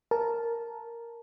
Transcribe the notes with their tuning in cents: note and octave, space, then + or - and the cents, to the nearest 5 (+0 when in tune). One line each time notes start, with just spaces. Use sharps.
A#4 +0 A5 -10